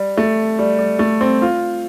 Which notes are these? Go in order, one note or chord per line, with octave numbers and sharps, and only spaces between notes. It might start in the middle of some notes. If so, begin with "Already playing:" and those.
Already playing: G3
A3
G3
G3
A3
C4
F4